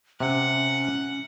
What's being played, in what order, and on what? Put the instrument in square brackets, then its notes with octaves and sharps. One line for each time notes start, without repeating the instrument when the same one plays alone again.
[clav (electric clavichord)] C3 [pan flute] C#4 [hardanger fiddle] F#5